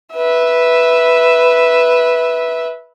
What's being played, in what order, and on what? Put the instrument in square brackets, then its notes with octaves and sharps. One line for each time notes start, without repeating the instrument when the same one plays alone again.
[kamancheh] B4 E5